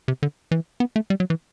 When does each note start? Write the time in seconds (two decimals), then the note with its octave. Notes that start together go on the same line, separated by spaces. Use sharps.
0.08 C3
0.23 D3
0.51 E3
0.80 B3
0.96 A3
1.10 G3
1.20 F#3
1.30 E3